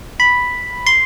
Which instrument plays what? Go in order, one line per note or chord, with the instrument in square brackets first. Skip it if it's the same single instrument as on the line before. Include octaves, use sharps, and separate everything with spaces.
[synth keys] B5
C6